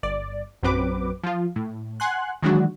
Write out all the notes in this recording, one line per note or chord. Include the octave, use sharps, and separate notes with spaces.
G1 D5
A#1 F#2 F#3 C4 B4 D6
F3 F4
A2
F#5 G#5 C6 F#6
D#3 E3 F#3 G#3 D4 F#4